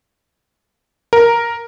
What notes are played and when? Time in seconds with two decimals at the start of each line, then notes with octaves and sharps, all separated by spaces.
1.13 A#4